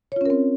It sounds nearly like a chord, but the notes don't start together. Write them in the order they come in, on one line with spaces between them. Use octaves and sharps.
C#5 F4 C#4 A#4 C4